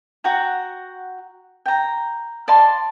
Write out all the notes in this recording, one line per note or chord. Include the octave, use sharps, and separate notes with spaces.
F#4 F#5 G5 A#5
G5 A#5
D5 F5 A5 C6